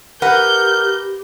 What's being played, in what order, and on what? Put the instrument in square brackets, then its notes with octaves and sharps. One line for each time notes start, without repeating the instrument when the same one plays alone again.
[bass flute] G4 [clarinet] A#4 [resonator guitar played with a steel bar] B4 F#5 [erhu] G6